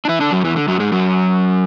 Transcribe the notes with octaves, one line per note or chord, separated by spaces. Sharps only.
D4
E3 E4
D3 D4
F#2 F#3
E2 E3
D3
F#2 F#3
G#2 G#3
F#2 F#3